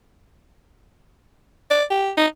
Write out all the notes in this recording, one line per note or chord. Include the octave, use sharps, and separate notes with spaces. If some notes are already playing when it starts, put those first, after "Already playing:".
D5
G4
D#4